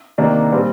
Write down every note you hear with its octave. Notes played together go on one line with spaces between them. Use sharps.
C3 D#3 A#3 D4
A#2 G3 C4